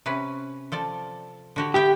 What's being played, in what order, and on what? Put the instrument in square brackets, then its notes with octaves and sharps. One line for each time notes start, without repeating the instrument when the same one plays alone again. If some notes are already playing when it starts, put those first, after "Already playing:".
[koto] C3 C#4 B4
F3 A4 D5
D3 F#4 G4
[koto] B3 E5 G5 [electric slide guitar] G4